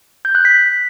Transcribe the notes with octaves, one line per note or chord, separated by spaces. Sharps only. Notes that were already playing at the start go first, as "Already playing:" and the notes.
G6
F#6
B6